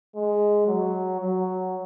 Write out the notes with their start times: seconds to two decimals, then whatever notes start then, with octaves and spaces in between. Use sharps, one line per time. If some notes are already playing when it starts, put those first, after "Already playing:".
0.16 G#3
0.67 F#3
1.20 F#3